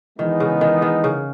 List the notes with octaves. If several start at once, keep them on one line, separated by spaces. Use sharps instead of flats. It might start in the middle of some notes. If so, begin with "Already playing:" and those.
D#3 E3 G#3 B3 D#4
C#3
D#3
D#3
C#3